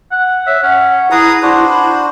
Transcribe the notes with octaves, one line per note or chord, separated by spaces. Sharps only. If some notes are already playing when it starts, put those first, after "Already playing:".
F#5
C#5 E5
C#4 F#5
E4 G#4 B4 A#5 D#6
D4 E4 F#4 C5
B5